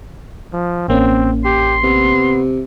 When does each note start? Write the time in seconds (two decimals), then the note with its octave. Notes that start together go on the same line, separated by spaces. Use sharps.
0.53 F3
0.88 A1 A#3 C4 C#4
1.44 G4 C6
1.84 C3 B3